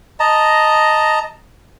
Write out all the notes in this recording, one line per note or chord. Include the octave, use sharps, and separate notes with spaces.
D#5 A5 A#5